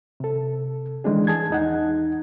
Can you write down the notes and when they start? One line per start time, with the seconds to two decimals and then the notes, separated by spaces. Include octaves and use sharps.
0.20 C3 A4
1.04 D#3 E3 G#3 C#4 D4 G#4
1.27 G#4 A5 G#6
1.50 E2 D#4 F#5